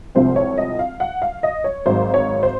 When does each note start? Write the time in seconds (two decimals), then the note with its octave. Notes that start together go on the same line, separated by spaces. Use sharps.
0.15 C2 C3 F3 G#3 C4 C5
0.36 C#5
0.58 D#5
0.79 F5
1.00 F#5
1.22 F5
1.43 D#5
1.64 C#5
1.86 G#1 G#2 F#3 C5
2.14 C#5
2.43 C5